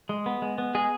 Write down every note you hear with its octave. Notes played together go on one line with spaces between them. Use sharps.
G#3
B3
G#3
B3
G#3 G#4